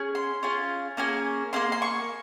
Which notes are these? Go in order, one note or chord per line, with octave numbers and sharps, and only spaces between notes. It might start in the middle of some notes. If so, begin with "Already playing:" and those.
Already playing: C#4 G#4
C6
C#4 F4 G#4
A#3 C#4 G#4
A#3 C#4 G#4 C6
C6
C#6